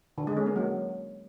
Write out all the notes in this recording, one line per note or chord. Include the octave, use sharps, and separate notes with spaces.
D3
G#3
C#4
A#3
F#3